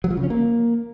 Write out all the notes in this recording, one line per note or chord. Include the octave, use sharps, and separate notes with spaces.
F#3
F3
C#3
C#4
A#3